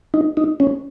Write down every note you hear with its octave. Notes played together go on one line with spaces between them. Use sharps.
D#4
D#4
C#4